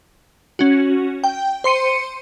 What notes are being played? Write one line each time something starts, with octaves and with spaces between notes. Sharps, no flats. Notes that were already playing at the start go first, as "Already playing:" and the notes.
C#4 F#4
G5
C5 C6 C#7 D#7